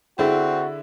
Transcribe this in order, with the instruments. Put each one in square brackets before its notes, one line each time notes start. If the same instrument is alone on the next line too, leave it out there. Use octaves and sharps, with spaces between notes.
[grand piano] D3 D4 E4 [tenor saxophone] C4 [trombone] F#4 [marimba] G#4